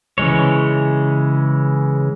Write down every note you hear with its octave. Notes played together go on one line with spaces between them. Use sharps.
C#3 E3 G#3 C#5